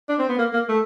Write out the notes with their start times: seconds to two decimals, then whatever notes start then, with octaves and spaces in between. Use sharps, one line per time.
0.09 D4
0.19 C4
0.29 B3
0.38 A#3
0.53 A#3
0.69 A3